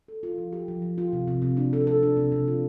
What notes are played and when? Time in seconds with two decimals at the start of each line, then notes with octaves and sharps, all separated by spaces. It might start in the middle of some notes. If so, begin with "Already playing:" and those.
0.08 A4
0.23 F4
0.38 F3
0.53 G4
0.68 F3
0.82 F3
0.98 F4
1.13 C3
1.28 C3
1.42 C3
1.57 D4
1.73 A4
1.87 A4
2.03 D4
2.17 C3
2.32 C3
2.48 F4